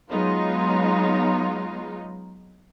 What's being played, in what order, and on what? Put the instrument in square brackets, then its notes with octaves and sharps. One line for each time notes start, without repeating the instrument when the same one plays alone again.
[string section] F#3 G#3 B3 D#4 F4